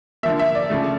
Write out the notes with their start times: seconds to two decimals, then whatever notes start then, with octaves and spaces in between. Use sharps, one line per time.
0.23 D3 F3 A#3 E5
0.39 E5
0.55 D5
0.70 C#3 F3 A3